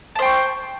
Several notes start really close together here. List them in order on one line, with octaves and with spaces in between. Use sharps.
A5 C5 G5 C#6